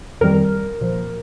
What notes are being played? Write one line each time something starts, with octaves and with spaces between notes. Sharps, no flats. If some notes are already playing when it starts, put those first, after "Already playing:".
F2 D#3 G3 A#4
A#2 F3